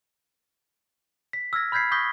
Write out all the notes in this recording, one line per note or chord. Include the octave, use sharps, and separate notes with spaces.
B6
E6 F6 G#6 A#6
B5 F6 G6 G#6 B6 C7
C#6 D#6 G6 A#6 B6 G7